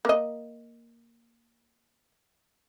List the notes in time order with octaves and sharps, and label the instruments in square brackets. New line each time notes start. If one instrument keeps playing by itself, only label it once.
[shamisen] A#3 D#5